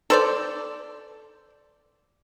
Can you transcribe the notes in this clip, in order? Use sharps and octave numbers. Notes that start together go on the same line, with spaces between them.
A4 C5 D5